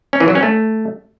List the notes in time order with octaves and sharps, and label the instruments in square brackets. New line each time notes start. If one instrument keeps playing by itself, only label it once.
[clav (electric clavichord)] C#4
E3
F#3
C#4
A3